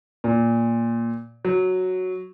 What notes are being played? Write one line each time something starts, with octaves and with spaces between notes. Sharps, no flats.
A#2
F#3